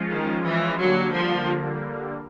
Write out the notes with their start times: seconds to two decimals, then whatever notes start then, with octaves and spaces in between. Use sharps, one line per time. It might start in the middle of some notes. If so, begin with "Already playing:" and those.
Already playing: F3 G#3 C#4 F4
0.10 D#3
0.44 E3
0.78 D3 F#3 G3 A#3
1.12 F3